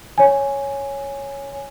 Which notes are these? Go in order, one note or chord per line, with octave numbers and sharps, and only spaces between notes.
C#5 G#5